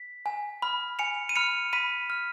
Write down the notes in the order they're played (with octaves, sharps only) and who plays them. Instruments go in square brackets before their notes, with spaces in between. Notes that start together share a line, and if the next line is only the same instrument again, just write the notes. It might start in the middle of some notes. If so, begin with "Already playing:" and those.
Already playing: [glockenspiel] B6
G#5
B5 F6
G#5 C#7 F7
D#7
B5 F6 C#7 F7
B5 B6 D#7
F6